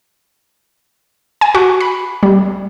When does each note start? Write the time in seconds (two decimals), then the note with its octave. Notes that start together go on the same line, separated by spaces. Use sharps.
1.41 G#5
1.55 F#4
1.81 B5
2.23 G3